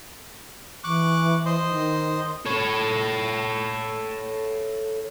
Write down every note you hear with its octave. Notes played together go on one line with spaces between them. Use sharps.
E3 C#6 D6 F#6
C5 D#5 C6
D#3
A4 C#5